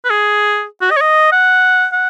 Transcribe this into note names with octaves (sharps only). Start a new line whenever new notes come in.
B4
G#4
F#4
D#5
C#5
D#5
F#5
F#5